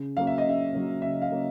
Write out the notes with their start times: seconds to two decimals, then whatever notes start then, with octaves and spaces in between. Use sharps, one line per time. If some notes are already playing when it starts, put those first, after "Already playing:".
Already playing: C#3
0.17 F#3 A#3 C#4 F5
0.27 E5
0.38 D#5
0.44 C#3 E5
0.73 F#3 A#3 C#4
1.02 C#3 E5
1.22 F5
1.30 F#3 A#3 C#4